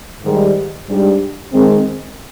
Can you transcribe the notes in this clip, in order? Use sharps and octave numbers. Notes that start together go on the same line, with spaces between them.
G#2 D#3 G3
G#2 G3 D4 G4
D#3 G#3 C4